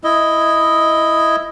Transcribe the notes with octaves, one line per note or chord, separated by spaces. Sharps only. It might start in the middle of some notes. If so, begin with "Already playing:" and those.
E4 D#5